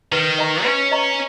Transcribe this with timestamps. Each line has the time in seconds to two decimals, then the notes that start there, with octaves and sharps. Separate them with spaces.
0.12 D#3 B4
0.38 D#5 A#5 C#6
0.65 C#4 B4
0.91 D#5 A#5 C#6